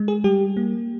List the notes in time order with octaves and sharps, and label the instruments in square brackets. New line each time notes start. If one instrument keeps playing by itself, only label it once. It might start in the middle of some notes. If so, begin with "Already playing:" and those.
Already playing: [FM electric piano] G#3
G#4
G3 G4
A#3